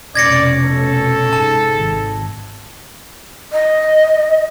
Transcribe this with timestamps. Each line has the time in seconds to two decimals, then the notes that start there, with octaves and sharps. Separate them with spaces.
0.15 F1 B2 C#4 D5 G#6 A#6 C#7
0.64 A4
1.33 G#2 A5
1.75 G#1
3.52 D#5